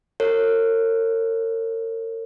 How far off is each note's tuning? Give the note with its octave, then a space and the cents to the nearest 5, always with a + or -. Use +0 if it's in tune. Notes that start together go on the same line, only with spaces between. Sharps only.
A#4 -40 C#5 -20